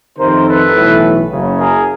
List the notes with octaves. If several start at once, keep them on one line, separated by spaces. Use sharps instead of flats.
F2 C3 D#3 A#4 C5
A4 B4
B1 A2 E3
F#1 F#2 C#3
G#4 A#4